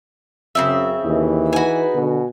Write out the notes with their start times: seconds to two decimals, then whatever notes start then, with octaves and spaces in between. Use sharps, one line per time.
0.55 F#2 C#3 C4 E5
1.05 D#2 B2 E3
1.53 D#4 F#4 G#4 B4 G#5
1.95 B2 D3